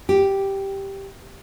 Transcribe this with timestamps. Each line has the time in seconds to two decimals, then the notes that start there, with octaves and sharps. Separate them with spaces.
0.09 G4